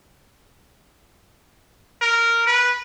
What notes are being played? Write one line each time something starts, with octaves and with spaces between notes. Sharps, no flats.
A#4
B4